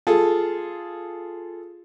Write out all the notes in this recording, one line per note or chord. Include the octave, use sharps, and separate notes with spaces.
F4 G#4 A4